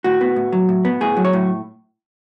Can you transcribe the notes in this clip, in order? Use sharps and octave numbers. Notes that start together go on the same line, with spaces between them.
A2 F#4
B3
A2
F#3
A2
B3
A2 G#4
F#3
C#5
A2